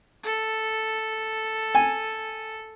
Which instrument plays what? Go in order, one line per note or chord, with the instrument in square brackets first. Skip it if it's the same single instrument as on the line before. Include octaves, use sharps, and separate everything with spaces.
[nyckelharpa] A4
[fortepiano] G#5